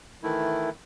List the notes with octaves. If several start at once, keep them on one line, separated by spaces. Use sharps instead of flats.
D#3 E3 A3 E4